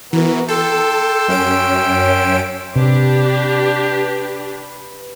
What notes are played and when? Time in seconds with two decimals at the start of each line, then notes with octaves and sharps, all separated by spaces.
0.13 E3 B3 F#4 A#4
0.48 A4 G5 C6 E6
1.28 F#2 C#4 D7
2.76 C3 D4 G4 B4